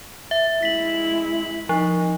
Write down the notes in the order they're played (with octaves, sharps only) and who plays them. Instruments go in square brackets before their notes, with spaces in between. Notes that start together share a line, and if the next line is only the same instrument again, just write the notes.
[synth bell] E5
[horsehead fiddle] G#3 E4 [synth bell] B6 F#7
[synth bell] F3 [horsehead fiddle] D#4